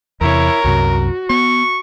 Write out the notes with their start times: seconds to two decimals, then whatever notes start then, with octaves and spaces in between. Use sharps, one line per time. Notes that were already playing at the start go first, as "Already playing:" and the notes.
0.21 E2 C3 E4 A#4 C#5
0.64 C2 F#2 C3 F#4
1.30 B3 C#6